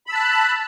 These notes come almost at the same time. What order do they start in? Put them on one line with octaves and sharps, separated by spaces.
B5 E6 A5 F#6